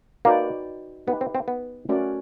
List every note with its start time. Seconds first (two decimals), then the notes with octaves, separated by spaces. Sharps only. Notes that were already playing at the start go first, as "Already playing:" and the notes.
0.25 A#3 D#4 F#4 B4 D5 G5
1.07 B3 D#4 G4 B4
1.21 C4
1.35 C4
1.48 B3
1.89 A3 C#4 F#4 A#4 D5